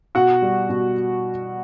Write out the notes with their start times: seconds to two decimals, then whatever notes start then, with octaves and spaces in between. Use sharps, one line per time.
0.15 B2 F#4 F#5
0.42 G3
0.69 B2